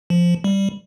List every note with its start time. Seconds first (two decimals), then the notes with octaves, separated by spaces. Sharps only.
0.10 F3
0.44 G3